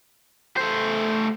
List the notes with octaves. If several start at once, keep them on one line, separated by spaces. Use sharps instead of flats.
A3 C5